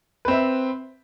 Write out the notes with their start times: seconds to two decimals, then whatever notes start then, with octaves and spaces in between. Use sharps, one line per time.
0.25 B4
0.28 C4
0.31 E5